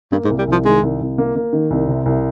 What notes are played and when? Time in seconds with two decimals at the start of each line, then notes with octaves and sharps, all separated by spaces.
0.12 G2 A#3
0.25 G#2
0.30 C2
0.38 G3
0.48 C2 F3
0.65 D#3 G#3
0.83 C2
1.01 C2
1.18 A#3
1.35 A#3
1.53 D#3
1.71 C2
1.88 C3
2.06 C2